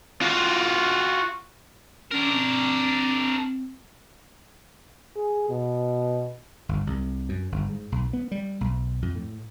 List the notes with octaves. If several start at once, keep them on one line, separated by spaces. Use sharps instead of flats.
F4 F#4
C#4 D4 A#4
C4
G#4
B2
G1
C2
F#2
G1
G#2
B1
B3
G3
B1
F2
A2